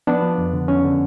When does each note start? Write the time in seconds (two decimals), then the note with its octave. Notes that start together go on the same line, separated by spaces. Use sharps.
0.07 F3 B3 D4
0.22 F3
0.38 F2
0.53 D3
0.68 F2 C#4
0.84 D3